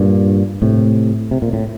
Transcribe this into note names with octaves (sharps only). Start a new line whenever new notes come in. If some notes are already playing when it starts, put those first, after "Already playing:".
Already playing: G2 A#2
A2 C3
C3
A#2
A2